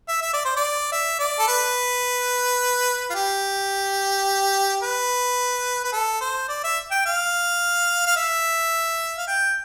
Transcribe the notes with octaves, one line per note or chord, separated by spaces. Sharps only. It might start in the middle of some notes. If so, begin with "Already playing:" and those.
E5
E5
D5
C5
D5
E5
D5
A4
B4
F4
G4
B4
B4
A4
C5
D5
E5
G5
F5
F5
E5
F5
G5